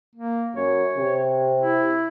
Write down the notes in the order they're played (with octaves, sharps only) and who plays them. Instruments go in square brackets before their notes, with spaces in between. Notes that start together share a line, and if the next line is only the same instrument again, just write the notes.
[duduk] A#3
[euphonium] F#2 [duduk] C#5
[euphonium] C3
[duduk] E4